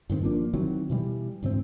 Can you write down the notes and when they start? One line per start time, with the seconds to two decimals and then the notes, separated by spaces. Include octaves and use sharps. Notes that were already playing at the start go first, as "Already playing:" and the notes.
0.10 G2 D#3 A#3 C4
0.22 G1 F3 A#3 D4
0.53 D#3 E3 F#3 C4
0.90 B2 E3 G3
1.43 D2 G#2 E3 C4